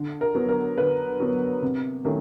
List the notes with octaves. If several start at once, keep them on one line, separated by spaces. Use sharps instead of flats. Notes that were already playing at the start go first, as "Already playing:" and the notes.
Already playing: D3
A#4
F#3 B3
A#4
D3 B4
F#3 B3
C3
D#3 F#3 A3 C#4